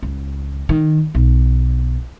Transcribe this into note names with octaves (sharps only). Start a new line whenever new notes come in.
C#2
D#3
B1